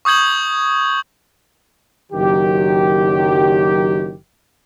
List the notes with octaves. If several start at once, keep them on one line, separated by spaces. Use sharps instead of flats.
C#6 D#6 G6 G#6 F#7
F#1 D#3 F#3 G4